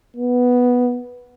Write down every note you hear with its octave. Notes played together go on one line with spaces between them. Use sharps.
B3